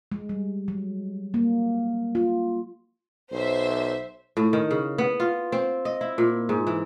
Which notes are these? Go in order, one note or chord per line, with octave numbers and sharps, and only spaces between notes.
G#3
G3
F#3
A#3
F4
B1 C5 E5
A2
D#3
C#3
B3
F4
C4
D#5
E4
A#2
G#2
E3